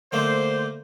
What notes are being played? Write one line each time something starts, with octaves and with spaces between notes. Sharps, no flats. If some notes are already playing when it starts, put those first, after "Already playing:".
D3 A3 A#3 C5